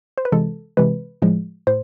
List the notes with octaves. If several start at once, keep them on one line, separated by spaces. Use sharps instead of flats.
C5
B4
C3 E3 G#3 A4
C3 E3 G#3 B4
A2 F3 G#3
A2 C5